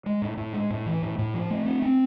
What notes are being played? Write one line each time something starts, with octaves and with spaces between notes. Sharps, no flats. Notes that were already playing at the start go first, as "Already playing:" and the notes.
G#3
A2
A2
G#3
A2
E3
A2
A2
F3
A3
C4
C4